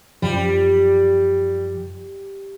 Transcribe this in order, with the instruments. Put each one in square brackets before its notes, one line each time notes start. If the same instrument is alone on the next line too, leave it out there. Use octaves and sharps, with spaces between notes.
[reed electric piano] F#2 F3 [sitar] G3